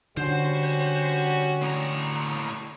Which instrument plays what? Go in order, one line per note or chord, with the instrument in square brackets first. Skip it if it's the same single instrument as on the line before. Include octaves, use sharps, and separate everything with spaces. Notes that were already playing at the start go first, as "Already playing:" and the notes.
[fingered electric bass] D3 [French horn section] G3 C#4 F#4 [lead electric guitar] C5
[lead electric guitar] A2 A#5